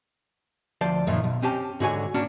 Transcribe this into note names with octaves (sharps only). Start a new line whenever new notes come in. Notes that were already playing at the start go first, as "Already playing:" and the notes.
D2 F3 C5 D5 A5
F#2 A#2 D#3 F3
B1
C4 C#4 G4 A5
G#2 D3 F#4 G#4 C#5 G#5
A#3 C#4 D4 F#4